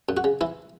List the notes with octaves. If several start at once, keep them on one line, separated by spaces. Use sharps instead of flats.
F#2
F#4
C#3
E3 E4